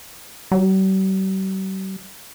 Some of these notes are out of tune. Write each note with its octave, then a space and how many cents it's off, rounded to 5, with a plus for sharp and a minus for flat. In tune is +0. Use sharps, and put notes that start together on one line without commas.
G3 -45